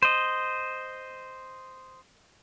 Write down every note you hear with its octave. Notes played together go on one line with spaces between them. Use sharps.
C5 D#5